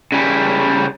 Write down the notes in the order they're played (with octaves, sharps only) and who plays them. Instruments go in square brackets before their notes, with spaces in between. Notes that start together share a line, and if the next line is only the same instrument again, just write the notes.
[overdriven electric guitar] C#3 G3